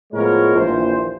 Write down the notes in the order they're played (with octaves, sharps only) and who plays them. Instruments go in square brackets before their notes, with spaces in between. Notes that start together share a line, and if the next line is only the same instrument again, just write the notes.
[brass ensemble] A2 F3 G#3 B3 A#4 C#5
A#1 D#2 E3 C5